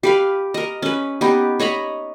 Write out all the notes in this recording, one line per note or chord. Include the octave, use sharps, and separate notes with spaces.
G4 B4 F5
A#4 D#5
C#4 B4
B3 D#4 G4
C#5 D#5 A#5 B5